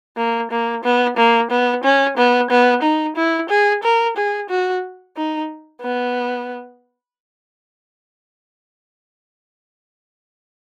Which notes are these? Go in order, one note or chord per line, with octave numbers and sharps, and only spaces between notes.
A#3
A#3
B3
A#3
B3
C#4
B3
B3
D#4
E4
G#4
A#4
G#4
F#4
D#4
B3